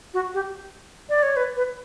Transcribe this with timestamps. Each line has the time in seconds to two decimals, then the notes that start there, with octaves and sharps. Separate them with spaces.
0.14 F#4
0.34 G4
1.09 D5
1.23 C#5
1.36 B4
1.56 B4